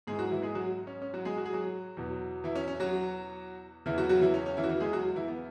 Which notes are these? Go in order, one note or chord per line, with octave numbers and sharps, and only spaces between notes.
G#2 E3 G#3 G#4
F#3 F#4
E3 E4
G#3 G#4
F#3 F#4
C#4
C#4
F#3 F#4
G#3 G#4
F#4
G#4
F#3 F#4
E2 B2 F#3
E3 E4
C#4
C#4
F#3 F#4
E2 C#3 E3 E4
F#3 F#4
F#3 F#4
E3 E4
C#4
C#4
E3 E4
F#4
E3 E4
G#3 G#4
F#3 F#4
E3 E4
B3